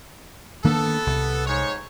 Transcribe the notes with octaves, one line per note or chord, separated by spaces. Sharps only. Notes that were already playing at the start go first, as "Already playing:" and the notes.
D#3 A#3 B3 D4 A4
C2
G#2 G#3 C#5